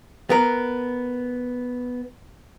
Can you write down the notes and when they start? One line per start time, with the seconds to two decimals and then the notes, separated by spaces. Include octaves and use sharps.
0.30 B3 A#4